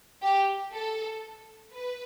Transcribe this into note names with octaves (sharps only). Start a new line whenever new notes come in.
G4
A4
B4